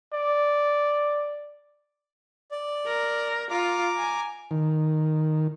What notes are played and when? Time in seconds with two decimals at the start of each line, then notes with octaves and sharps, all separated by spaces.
0.13 D5
2.51 D5
2.86 A#4
3.50 F4 A#5 D6
3.97 G#5
4.51 D#3